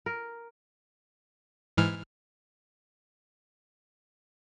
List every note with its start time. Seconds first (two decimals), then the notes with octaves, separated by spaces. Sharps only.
0.06 A#4
1.77 G#2 E3 F6